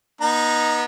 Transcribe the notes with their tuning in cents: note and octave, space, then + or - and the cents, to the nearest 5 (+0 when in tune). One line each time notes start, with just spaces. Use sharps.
B3 -30 D#4 +0 A#5 +0